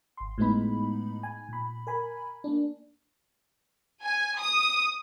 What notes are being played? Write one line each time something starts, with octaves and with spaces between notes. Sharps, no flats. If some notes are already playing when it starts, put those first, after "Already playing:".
G#1 C6
A2 G#3 B3 D#4 B5
G#5
A#2 B5
A#4 G#5 B5
A#3 D4
G#5
D#6